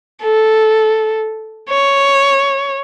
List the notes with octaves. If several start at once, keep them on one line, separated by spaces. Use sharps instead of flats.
A4
C#5